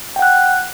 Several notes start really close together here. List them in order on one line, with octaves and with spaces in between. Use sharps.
G5 F#5 F#6